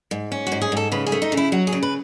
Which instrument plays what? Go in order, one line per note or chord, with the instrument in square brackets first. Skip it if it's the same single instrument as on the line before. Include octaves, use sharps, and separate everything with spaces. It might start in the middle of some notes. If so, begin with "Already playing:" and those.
[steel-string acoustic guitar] G#2
C#4
F#4
G#2
G#4
G#2 A4
C#3 B4
G#4
A3
D#4
C#3
E4
F#3 F#4
G#4
C#3
B4